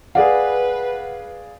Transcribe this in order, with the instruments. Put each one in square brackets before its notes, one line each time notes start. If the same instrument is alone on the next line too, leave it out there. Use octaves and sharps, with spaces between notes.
[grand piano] G#4 D5 F5 [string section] B4 [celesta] F#5